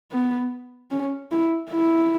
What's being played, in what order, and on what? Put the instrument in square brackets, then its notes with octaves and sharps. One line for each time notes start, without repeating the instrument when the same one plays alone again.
[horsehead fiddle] B3
C#4
E4
E4